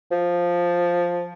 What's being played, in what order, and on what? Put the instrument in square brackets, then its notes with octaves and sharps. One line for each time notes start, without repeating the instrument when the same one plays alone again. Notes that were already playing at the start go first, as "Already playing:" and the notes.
[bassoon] F3